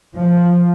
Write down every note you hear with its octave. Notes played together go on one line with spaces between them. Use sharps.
F3